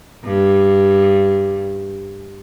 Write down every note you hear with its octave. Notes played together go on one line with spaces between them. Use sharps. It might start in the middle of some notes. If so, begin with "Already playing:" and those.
G2